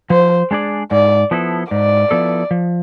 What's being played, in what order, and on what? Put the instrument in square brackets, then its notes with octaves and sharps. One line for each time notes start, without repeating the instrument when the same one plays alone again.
[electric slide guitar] F3 [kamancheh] C5
[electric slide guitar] G#3 D4 G#4 D5
[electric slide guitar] G#2 [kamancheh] D5
[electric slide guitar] F3 B3 E4 A4
[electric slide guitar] G#2 [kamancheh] D5
[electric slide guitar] F3 B3 E4 A4
F3